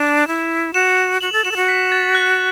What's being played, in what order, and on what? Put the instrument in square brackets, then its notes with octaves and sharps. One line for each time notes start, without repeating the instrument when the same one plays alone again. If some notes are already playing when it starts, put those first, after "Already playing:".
Already playing: [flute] D4 [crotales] E7
[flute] E4
[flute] F#4 [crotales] E7
[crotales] E7
[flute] F#4 [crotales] F#7
[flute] A4
[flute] F#4 [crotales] E7
[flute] A4
F#4
[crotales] B6
A6
F#6